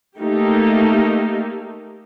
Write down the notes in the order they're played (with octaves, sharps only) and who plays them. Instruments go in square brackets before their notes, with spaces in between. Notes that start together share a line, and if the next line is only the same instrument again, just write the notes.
[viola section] A3 A#3 D#4 G4